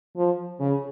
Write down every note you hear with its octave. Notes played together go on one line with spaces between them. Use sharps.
F3
C#3